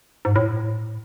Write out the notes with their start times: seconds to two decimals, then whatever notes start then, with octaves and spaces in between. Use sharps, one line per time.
0.25 G#2
0.36 A2